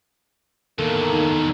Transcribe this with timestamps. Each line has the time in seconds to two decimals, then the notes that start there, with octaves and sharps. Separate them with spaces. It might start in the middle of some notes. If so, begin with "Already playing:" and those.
0.79 E2 D#3 A#3 A4
1.13 D#4